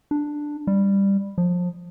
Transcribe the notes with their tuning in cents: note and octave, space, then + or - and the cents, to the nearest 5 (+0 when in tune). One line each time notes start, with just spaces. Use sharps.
D4 +5
G3 +10
F3 +25